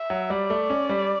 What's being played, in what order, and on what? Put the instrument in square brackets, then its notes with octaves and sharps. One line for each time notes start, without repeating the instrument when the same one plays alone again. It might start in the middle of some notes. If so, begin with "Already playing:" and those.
Already playing: [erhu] E5
[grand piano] F#3
[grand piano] G3 [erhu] D5
[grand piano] A3
C#4
G3